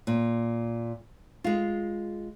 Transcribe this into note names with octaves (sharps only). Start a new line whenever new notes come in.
A#2
G#3 F4